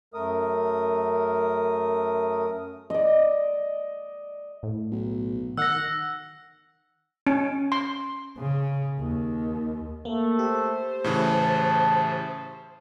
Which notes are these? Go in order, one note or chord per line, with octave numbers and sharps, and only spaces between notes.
F#2 A3 A#4 D#6
D5 D#5
A2
B1
D#3 F#5 E6 A#6
C#4
C6
C#3
D#2
A3 A#3
G4 C5
A2 C#3 E3 A5